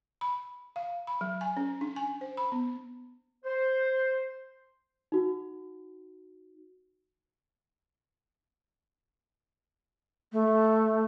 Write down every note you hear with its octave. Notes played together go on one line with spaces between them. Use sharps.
B5
F5
B5
F#3
G#5
C#4
D4
G#5
C5
B5
B3
C5
D#4 F#4
A3